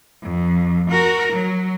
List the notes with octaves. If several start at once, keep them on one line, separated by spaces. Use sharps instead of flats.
F2
F#4 A#4
F#3